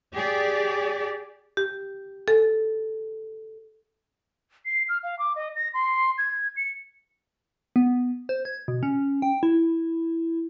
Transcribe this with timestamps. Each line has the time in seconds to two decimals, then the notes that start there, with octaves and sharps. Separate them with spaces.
0.14 G4 G#4 D5
1.57 G4
2.28 A4
4.65 C7
4.89 F6
5.03 F5
5.19 D6
5.36 D#5
5.56 A#6
5.74 C6
6.18 G#6
6.56 C#7
7.76 B3
8.29 C5
8.45 G#6
8.68 B2
8.83 C#4
9.22 G5
9.43 E4